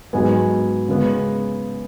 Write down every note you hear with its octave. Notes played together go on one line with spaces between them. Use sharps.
G#2 F#3 B3 G#5
C#3 G#3 B3